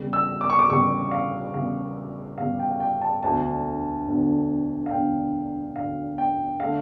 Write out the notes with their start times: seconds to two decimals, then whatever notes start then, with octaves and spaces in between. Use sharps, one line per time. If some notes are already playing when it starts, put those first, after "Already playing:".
Already playing: E2 C#3 G3
0.13 E6
0.41 D6
0.50 C#6
0.59 D6
0.69 E2 C#3 G3 C#6
1.11 F5
1.54 E2 C#3 G3 F5
2.38 E2 C#3 G3 F5
2.59 G5
2.71 F5
2.80 G5
3.01 A5
3.23 E1 D2 D3 A5
4.07 E1 D2 D3
4.86 F5
4.91 E1 D2 D3 G5
5.76 E1 D2 D3 F5
6.18 G5
6.60 D3 A3 F5